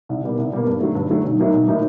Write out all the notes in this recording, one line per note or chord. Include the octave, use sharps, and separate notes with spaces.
C2
B2 G3 A#3
C2
B2 G3 A#3
G2
D3 F#3 A3
G2
D3 F#3 A3
B1
A2 F#3 A#3 D#4
B1
A2 F#3 A#3 D#4